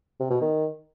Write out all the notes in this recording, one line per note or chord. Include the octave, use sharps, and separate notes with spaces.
C3
B2
D#3